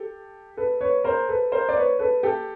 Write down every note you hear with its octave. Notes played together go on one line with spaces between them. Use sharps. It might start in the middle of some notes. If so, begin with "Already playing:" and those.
Already playing: G4 A4
A4 B4
B4 C#5
A#4 C5
A4 B4
A#4 C5
D5
B4 C#5
A4 B4
G4 A4